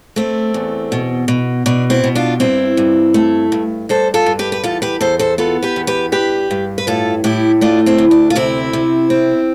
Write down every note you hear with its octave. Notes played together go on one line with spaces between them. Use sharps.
A3 C4
E2
B2
B2
B2 D4
C4 E4
B2
D4 F4
G2 C4 E4
G2
A3
G2
G2 A4 C5
F4 A4
G2
G4 B4
B4
E2 F4 A4
G4 B4
E2 A4 C5
A4 C5
B3 F4 A4
G4 B4
E2
G4 B4
G2 G4 B4
G2
B4
A2 F4 A4
A2 E4 G4
A3 D4 F4
C4 E4
D2
D4
F4
C3 C4 E4
C3
C4